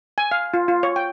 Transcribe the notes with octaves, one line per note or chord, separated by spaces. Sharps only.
G#5
F5
F4
F4
C#5
G5